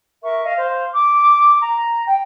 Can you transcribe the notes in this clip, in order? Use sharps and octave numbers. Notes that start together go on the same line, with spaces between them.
A#4 E5 C#6
D#5 F5
C5 F5
D6
A#5
G5